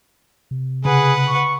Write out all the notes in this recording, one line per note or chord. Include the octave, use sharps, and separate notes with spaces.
C3
C#3 G#4 B4 F#5
C#6